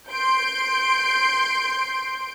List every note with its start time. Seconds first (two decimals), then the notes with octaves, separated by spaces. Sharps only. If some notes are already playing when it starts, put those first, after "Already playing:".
0.10 C6 G6 D7